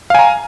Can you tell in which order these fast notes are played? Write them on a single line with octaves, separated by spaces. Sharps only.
F5 G#5 A#5